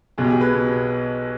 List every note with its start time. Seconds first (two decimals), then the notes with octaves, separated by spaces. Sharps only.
0.18 B1 B2 G#4
0.24 G4
0.30 G#4
0.41 B4
0.54 B2